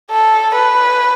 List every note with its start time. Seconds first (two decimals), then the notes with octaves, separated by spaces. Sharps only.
0.11 A4
0.55 B4